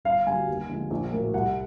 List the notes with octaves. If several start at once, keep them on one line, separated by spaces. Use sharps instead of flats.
G1 F5
G2 D3 F#3 G#5
D#2
D3 F3 G#3
A#1
A2 F#3 A#3
C2 F#5